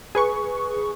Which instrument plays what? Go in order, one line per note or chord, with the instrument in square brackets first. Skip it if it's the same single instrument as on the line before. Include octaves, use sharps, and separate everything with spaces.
[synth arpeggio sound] G#4 B4 C#6